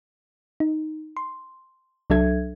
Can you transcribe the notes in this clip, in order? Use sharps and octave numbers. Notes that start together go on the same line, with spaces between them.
D#4
C6
C2 F#3 D4 A4 E5 G#6